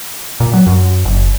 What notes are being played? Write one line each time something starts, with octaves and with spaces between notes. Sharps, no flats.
A#2
F#3
F#2
F#1